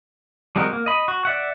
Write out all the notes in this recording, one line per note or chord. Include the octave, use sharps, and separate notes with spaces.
G3 G#3 C4 F#4 A#4
A#3
D#5 B5
F#4
D5 E5 F#5